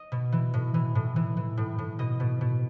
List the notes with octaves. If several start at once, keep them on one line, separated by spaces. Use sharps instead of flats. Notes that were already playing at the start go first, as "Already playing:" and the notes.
Already playing: D#5
B2
E3
A2
E3
A2
E3
E3
A2
A2
B2 D#5
B2
B2